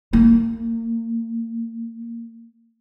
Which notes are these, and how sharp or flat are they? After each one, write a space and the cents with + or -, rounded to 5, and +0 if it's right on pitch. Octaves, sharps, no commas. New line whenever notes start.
A#3 -30